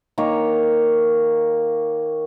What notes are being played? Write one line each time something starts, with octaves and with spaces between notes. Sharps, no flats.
D#3 A#3 C#5